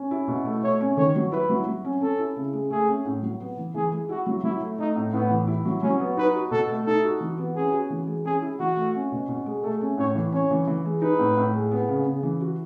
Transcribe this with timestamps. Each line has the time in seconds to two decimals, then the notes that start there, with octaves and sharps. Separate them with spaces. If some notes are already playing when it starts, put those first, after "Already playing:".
Already playing: C#4
0.11 E4
0.28 B2
0.45 A3
0.63 A3 C#5
0.81 C#4
0.97 D#3 C#5
1.16 F#3
1.32 E4 B4
1.49 F#3
1.67 F#3
1.85 C#4
2.01 C#4 A4
2.19 E4
2.36 C#3
2.53 G#3
2.70 A3 G#4
2.88 C#4
3.05 A2
3.23 F#3
3.40 B3
3.57 E3
3.75 E3 G#4
3.92 G#3
4.09 E4 F#4
4.26 F#3
4.43 F#3 E4
4.61 A3
4.79 A3 D#4
4.96 A2
5.13 A2 B3
5.30 E3
5.47 E4
5.65 F#3
5.82 F#3 C#4
6.00 B3
6.17 D#4 B4
6.35 F#4
6.51 B2 A4
6.70 A3
6.86 D#4 A4
7.04 F#4
7.20 E3
7.38 B3
7.56 C#4 G#4
7.73 F#4
7.90 E3
8.07 G#3
8.25 C#4 G#4
8.42 E4
8.59 E3 F#4
8.76 A3
8.95 C#4
9.12 B2
9.29 B2
9.46 G#3
9.63 A3 A4
9.81 C#4
9.97 A2 C#5
10.15 E3
10.32 C#4 C#5
10.51 E3
10.67 E3
10.85 G#3
11.02 D#4 B4
11.19 A2
11.37 A2
11.53 G#3
11.71 B3
11.88 C#3
12.06 C#3
12.23 E3
12.41 F#4